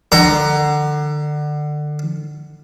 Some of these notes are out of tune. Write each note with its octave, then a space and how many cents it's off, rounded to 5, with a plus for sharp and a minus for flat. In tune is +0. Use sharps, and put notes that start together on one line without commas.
D3 +25 A#5 +0